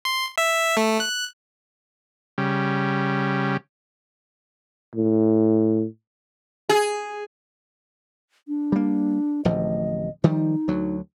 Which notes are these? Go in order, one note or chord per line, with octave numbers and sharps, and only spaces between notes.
C6
E5
A3
F#6
C#3 G3
A2
G#4
D4
G3 A#3
D1 A1 F3 D#5
D#3 F3 G3 D#4
D2 F#3